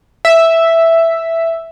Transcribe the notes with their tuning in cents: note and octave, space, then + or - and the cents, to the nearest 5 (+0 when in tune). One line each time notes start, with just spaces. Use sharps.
E5 +0